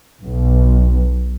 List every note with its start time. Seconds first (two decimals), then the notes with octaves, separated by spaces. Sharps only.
0.22 B1